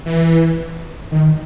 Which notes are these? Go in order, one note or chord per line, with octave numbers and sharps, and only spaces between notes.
E3
D#3